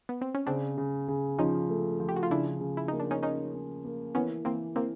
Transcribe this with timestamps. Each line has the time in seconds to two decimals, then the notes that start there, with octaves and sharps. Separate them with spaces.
0.09 B3
0.21 C4
0.35 C#4
0.46 C#3 C4 D4
0.78 C#3
1.08 C#3
1.39 F3 C#4 D#4
1.70 A3
2.00 F3
2.09 G4
2.16 F#4
2.23 F4
2.30 C#3 D4 E4
2.61 C#3
2.77 E4
2.88 A#3 D#4
3.00 D4
3.11 C#4 D#4
3.23 A#3 C#4 D#4
3.54 C#4
3.85 A#3
4.15 E3 B3 C#4
4.45 E3 A#3 C4
4.76 E3 A#3 C4